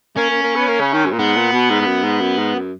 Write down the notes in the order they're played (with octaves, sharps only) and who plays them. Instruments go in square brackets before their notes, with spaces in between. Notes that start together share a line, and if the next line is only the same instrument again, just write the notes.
[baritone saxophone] A#3 [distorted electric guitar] C#4
[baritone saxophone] A#3
A#3
B3
A#3
C#3
D#3
F#2
A#2
[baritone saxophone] G#2 [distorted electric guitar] B3
[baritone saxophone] A#2
B2
G#2
G#2
F#2
G#2
F#2
G#2
F#2